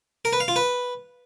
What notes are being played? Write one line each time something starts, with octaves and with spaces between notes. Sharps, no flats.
A#4
B4
F5
F4
B4